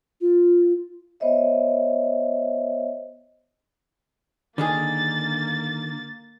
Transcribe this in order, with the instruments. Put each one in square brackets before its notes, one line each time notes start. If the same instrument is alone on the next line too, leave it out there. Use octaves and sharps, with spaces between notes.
[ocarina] F4
[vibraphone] B3 C5 C#5 D#5 E5
[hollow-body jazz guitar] D3 D#3 G#4 [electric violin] A#3 A6